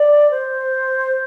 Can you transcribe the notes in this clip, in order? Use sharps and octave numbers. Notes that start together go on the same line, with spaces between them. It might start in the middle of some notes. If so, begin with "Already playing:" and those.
Already playing: D5
C5